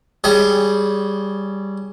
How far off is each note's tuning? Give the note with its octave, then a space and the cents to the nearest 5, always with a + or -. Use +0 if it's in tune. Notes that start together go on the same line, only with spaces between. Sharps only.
G3 +0 G#4 +0 C#5 +20